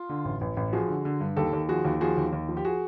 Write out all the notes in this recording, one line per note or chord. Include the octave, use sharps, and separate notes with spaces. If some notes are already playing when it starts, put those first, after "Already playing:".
Already playing: F4
D3
A1
A1
A1
F3 F#4 G#4
D3
D3
G2
D#2 G4 A4
D#2
F3 F#4 G#4
D#2
F3 F#4 G#4
D#2
D#2
F3
G4
F#4 G#4